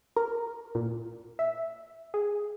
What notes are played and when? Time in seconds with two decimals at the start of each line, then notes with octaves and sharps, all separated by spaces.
0.17 A#4
0.75 A#2
1.39 E5
2.14 G#4